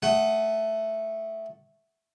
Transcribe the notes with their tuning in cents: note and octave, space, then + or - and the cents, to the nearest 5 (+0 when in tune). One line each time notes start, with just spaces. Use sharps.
A3 +0 F#5 +25 D#6 +0